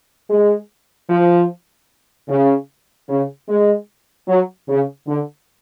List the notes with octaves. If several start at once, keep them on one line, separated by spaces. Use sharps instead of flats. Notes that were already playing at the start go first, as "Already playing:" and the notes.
G#3
F3
C#3
C#3
G#3
F#3
C#3
D3